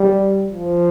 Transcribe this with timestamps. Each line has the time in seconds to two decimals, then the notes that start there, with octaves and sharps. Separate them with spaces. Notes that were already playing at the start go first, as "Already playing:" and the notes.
Already playing: G3
0.51 F3